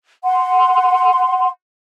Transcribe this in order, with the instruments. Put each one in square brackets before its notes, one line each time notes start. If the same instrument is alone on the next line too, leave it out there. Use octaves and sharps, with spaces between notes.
[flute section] F#5 C6